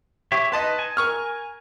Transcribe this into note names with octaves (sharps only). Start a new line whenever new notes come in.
G4 C#5 E5
D#4 B4 D#5 A5 C6
G#5
A#4 C#6 F6